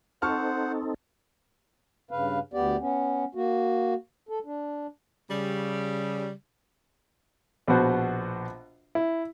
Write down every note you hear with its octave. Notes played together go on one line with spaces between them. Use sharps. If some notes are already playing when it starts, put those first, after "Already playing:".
C4 D#4 A4 C5 F#5 A5 C#6 F6
G2 C#3 B4 F5
D2 B3 G4 D5
B3 C#4
A#3 F#4
A4
D4
C#3 G3
A#1 B2 B3 F#4 C5
E4